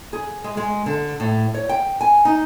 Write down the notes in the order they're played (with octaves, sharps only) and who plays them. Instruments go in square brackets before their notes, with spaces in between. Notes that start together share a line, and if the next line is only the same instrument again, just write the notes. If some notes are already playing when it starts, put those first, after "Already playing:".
[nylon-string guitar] G#4
G#3
G#3
D3
A2
C#5
G5
G#5
D#4